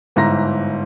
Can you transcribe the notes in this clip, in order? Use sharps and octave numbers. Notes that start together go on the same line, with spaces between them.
G1 G#2 E4 A#5 A#6